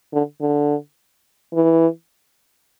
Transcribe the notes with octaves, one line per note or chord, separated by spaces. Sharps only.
D3
D3
E3